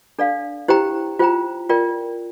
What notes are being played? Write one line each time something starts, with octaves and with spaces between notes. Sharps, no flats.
D4 A4 D5 F5
E4 G4 C5 G5 A#5
F4 C5 G5 A#5
F4 A#4 D5 G5